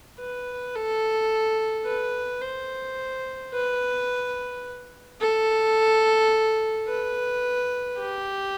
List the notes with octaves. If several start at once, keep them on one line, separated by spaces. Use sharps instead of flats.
B4
A4
B4
C5
B4
A4
B4
G4